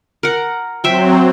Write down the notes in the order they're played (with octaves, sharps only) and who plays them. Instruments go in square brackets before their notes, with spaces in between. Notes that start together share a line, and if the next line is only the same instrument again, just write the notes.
[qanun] A#4 F#5
[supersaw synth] F#3 C4 [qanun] C5 E5 G5